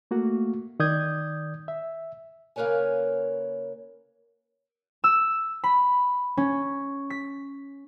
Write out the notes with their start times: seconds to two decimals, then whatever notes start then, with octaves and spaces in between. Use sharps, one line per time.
0.11 A3 A#3 F#4
0.80 D#3 D5 D#6 G6 G#6
1.68 E5
2.56 C#3 A#3 A#4 B4 C#5 G#5
5.04 E6
5.64 B5
6.37 C#4
7.10 B6